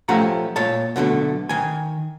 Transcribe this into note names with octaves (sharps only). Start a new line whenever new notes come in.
F3 A3 C#4 G4 F#5 A#5
A#2 C#5 A5
B2 D3 F#3 A3
D#3 G#5